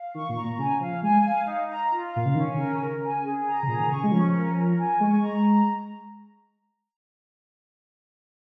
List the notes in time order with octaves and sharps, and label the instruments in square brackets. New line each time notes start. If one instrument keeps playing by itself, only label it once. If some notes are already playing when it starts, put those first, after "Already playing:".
Already playing: [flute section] F5
[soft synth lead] D#3 [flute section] C#6
[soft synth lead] A#2
[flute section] A#5
[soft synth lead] A#2
[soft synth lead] C#3 [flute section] G#5
[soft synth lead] F3 [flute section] F5
[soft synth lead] G#3 [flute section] G#5
[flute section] F5
D#4
A#5
F4
[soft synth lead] A#2 [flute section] F5
[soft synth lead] C#3
[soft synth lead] D#3 [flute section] C#4
[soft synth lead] C#3 [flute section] A#4
[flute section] A#4
G#5
G#4
A#5
[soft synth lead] C#3
[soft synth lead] A#2 [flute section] G#4
[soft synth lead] D#3
[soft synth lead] C#3 [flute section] C#6
[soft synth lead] G#3
[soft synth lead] F3 [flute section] C#4
[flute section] A#4
A#4
G#5
[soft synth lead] G#3 [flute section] C#6
[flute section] A#5